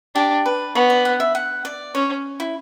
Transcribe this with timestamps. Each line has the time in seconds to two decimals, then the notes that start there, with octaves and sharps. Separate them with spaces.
0.15 D4 G4
0.46 B4
0.75 B3 C#5
0.90 D5
1.05 F#5
1.20 E5
1.35 F#5
1.65 D5
1.94 C#4 C#5
2.40 E4